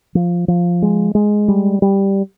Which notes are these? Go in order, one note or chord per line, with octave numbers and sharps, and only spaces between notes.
F3
F3
G#3
G#3
G3
G3